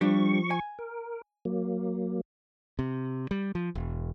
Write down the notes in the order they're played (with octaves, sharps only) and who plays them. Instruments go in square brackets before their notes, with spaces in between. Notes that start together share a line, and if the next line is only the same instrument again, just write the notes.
[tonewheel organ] F3 C#6 [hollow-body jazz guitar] G3 D4 G4
[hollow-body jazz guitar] G#5
[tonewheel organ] A#4
F#3 A#3
[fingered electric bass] C3
G3
F3
E1